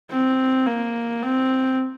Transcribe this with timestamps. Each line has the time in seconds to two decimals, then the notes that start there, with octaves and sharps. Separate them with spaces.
0.11 C4
0.66 A#3
1.23 C4